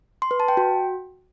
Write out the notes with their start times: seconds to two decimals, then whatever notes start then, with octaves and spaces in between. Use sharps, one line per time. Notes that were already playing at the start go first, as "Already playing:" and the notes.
0.22 C6
0.31 B4
0.40 A5
0.48 G5
0.57 F#4